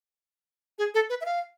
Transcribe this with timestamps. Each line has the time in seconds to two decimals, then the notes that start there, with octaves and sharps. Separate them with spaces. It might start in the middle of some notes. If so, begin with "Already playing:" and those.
0.79 G#4
0.94 A4
1.10 B4
1.21 E5
1.25 F5